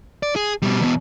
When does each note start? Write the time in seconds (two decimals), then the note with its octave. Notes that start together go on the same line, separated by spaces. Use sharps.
0.23 D5
0.36 G#4
0.62 B2 G3
0.81 E2 B2